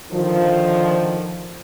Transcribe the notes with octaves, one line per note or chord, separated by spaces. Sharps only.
D3 D#3 F3